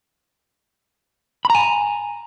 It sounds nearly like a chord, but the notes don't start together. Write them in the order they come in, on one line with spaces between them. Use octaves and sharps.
B5 A#5 G#5